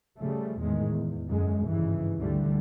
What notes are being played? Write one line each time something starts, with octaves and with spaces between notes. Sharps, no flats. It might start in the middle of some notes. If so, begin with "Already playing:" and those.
C#3 F3 G3 A3
E2 A2 D#3 G#3
E2
F#2 D3 G#3
G#1 G2 C#3 E3
D2 D3 G3 A3